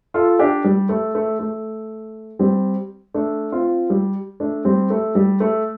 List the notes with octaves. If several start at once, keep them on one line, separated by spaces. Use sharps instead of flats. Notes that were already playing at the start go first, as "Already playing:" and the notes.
F4 A4
D4 G4
G3
A3
A3
A3
G3 C4
A3 D4
C4 F4
G3
A3 D4
G3 C4
A3
G3
A3